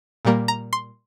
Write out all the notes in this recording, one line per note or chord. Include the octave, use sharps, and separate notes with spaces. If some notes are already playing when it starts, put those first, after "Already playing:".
A#2 G3 A#3
A#5
C6